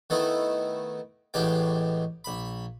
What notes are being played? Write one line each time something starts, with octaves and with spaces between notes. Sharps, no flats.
D#3 A3 B3 E4 D#5
A1 A2 G#3 B3 G4 G5
A#1 B5